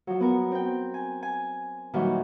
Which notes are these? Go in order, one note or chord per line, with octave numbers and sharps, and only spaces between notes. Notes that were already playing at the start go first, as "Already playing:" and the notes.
F3 F#3
B3 A#4
C4 G5
G#5
G#5
A#2 D#3 E3 F#3 G3